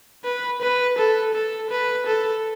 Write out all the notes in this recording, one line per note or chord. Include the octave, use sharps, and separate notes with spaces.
B4
B4
A4
A4
B4
A4